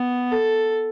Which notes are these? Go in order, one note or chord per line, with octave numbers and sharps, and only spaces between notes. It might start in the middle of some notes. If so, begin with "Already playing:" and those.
Already playing: B3
A4